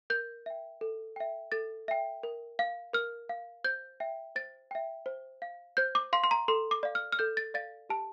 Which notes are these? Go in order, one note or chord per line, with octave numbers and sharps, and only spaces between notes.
A#4 G6
E5 G5
A4
E5 G5
A4 A6
E5 G5
A#4
F5
A#4 F6
F5
C5 G6
E5 G5
C5 A6
E5 G5
C5
F5
C5 G6
D6
F5 C6
C6
A#5
A4 C6
D6
D5 F5
F6
F6
A4 G6
A6
D5 F5 A6
G4 A5